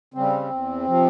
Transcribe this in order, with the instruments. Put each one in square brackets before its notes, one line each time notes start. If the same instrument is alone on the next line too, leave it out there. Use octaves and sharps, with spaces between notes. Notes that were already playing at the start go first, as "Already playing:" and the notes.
[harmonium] C#3 G3 C4
E2
C3 F3